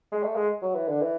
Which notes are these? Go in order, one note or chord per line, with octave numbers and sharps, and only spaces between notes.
G#3
A3
G#3
F#3
E3
D3
E3